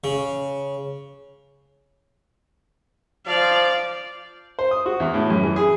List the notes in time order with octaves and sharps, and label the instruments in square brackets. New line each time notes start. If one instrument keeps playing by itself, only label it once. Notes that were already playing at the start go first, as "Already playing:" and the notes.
[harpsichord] C#3
[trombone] F3 [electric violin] D5 F5
[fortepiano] C5
D#6
F#4
E2
A2
F#2
E3
G#4